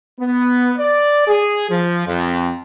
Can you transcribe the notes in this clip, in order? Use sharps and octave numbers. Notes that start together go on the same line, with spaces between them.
B3
D5
G#4
F3
F2